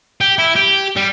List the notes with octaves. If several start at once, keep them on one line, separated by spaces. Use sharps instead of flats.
G4
E4
G4
G3